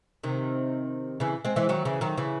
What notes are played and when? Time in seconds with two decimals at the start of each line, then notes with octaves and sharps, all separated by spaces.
0.24 C3 D#3
1.20 C#3 E3
1.45 G#3 C4
1.56 E3 G#3
1.69 D#3 F#3
1.85 C#3 E3
2.01 D#3 F#3
2.17 C#3 E3